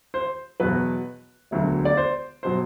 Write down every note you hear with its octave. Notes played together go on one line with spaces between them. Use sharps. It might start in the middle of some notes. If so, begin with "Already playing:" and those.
C5
E2 B2 F#3 B4
E1 D2 D3 F#3
D5
C5
B2 F#3 C5